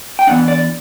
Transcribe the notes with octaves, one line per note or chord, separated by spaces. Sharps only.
G5
E3 B3 D4 F#5
D5